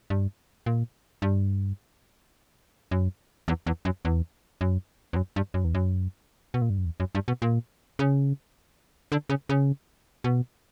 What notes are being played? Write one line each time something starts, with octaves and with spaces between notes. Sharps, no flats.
G2
A#2
G2
F#2
E2
E2
F#2
E2
F#2
E2
F#2
G2
F#2
E2
F#2
B2
A#2
G2
F#2
E2
F#2
G2
B2
A#2
C#3
D3
C#3
C#3
B2